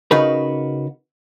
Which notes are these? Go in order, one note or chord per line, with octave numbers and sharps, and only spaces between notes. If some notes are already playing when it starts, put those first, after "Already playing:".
C#3 D#4 F#4 A#4 B4